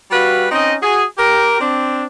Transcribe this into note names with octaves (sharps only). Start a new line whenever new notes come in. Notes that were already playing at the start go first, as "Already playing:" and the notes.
G3 F#4 B4 F5
C4 C#4 D#4 D#5
F#4 G#4
G4 A#4
C4 D4